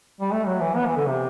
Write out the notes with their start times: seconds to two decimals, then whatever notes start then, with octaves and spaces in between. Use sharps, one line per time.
0.21 G3
0.32 A3
0.46 F#3
0.61 E3
0.76 B3
0.86 E3
0.97 D3
1.08 C3